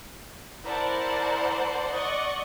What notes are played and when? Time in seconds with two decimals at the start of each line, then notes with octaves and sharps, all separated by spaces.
0.65 E4 A#4 C5 D5 F#5 A5
1.91 D5 D#5 F#5 C#6